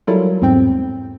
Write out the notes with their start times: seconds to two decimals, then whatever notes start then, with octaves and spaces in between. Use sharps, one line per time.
0.07 F#3 G3 E4 F4 A4 A#4
0.42 E2 G#2 C4 G5